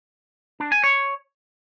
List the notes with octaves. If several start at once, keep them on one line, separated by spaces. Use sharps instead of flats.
D4
G#5
C#5